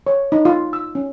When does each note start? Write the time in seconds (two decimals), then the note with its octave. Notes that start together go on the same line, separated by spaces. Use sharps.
0.07 C#5
0.32 D#4
0.45 F4
0.73 E6
0.95 C#4